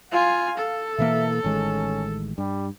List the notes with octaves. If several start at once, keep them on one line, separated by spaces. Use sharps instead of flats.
F4 F5 G#5
A4
B2 E3 A#3 E5
A1 D#3 G#3 C#4
G2 G3